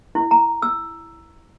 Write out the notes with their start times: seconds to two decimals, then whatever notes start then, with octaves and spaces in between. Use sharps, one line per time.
0.15 E4
0.31 A#5
0.62 E6